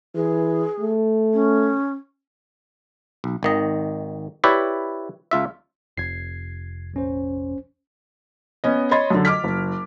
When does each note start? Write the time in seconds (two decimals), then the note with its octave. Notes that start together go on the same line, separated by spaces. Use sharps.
0.15 E3 G#4
0.80 A3
1.33 C#4
3.24 B1
3.43 G#1 D#3 D#5
4.44 E4 G4 B4 C#5 D5 E5
5.31 C#2 F4 E5
5.98 F1 G#6 C7
6.94 A#1 C#4 C5
8.64 B3 C#4 D#5
8.91 C#5 D#5 B5 C6 A6
9.10 F#2 D3
9.25 D#5 D6 F6 B6
9.44 F#1